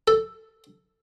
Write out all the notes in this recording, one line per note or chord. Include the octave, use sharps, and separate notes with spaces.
A4